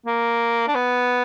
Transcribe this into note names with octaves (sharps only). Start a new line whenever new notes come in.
A#3
D4
B3